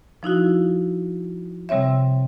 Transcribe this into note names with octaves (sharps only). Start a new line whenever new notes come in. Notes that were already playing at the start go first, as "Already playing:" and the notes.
F3 D#4 E4 F#4
C3 G3 C4 C#5 E5